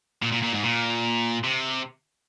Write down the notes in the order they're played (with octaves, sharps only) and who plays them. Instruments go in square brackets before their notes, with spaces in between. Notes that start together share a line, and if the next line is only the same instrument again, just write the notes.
[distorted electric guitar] A#2
A#2
A#2
G#2
A#2
C3